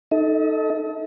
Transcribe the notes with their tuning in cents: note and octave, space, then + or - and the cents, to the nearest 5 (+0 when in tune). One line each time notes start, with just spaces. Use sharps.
D#4 +0 A4 +0 D#5 +45